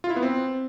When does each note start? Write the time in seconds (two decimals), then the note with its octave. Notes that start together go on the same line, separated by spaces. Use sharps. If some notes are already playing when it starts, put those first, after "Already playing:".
0.04 F4
0.10 E4
0.16 B3
0.22 C4